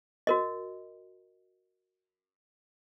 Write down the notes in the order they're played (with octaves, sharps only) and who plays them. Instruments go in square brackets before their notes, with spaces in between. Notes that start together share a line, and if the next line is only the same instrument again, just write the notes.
[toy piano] F#4 A#4 D#5